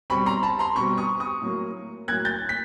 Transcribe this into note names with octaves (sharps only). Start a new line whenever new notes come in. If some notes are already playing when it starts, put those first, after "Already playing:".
B2 G3 C4 B5 C#6
A#5 C6
A5 B5
A#5 C6
B2 G3 C4 B5 C#6
C#6 D#6
C#6 D#6
A2 F#3 A#3
A2 F#3 A#3 F#6 G#6
G6 A6
B6